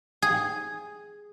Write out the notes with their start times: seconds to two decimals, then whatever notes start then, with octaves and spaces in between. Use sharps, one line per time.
0.22 G#4